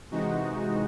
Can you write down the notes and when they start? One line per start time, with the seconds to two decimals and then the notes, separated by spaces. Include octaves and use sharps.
0.11 C3 E3 G#3 D#4 F#4